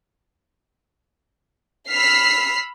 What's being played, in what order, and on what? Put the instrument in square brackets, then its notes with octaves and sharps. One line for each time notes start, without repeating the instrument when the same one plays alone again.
[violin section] B5 E6 F6 B6 C7